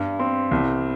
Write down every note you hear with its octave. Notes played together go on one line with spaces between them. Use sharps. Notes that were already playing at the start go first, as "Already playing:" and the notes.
Already playing: G2
C4
C2